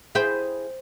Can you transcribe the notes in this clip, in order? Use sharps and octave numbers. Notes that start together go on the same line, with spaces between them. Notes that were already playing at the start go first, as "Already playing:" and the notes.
E4 G#4 C5 G5 B5